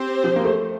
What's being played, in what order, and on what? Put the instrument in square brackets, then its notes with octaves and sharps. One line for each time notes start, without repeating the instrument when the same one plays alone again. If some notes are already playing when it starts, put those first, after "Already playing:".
Already playing: [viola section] C4 G4 C5
[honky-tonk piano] F3
A#3
A3